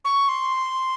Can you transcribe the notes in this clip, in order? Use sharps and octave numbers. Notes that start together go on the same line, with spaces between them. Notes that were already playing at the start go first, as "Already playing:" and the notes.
C#6
C6